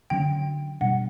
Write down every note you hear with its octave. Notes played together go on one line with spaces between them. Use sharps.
D3 F#3 C#4 G5
B2 G3 D4 F#5